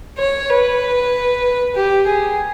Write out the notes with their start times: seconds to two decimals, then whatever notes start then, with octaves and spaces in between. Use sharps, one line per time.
0.18 C#5
0.50 B4
1.75 G4
2.07 G#4